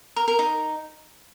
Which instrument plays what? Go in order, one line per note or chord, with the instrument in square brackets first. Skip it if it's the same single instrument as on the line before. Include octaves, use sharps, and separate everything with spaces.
[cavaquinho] A#4
A#4
D#4